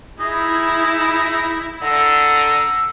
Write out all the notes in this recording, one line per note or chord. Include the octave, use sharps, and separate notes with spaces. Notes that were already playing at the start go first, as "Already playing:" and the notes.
D#4 E4 G#4
D3 A#5 E6